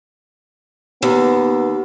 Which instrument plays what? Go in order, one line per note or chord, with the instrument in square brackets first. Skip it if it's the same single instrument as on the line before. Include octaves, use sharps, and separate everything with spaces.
[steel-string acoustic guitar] D#2 [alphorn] B3